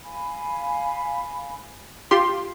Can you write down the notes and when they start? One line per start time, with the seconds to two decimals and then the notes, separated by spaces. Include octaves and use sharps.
0.04 F5 G#5 B5
2.11 F4 G4 C6